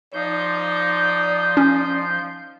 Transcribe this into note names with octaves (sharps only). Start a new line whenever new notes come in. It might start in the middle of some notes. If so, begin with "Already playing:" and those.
F3 D#4 D5 C6 G6
C#4